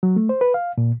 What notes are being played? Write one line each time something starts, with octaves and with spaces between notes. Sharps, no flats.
F#3
A3
C5
B4
F5
A#2